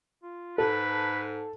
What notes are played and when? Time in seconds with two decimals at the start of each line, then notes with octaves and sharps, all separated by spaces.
0.23 F4
0.58 G#2 A4 B4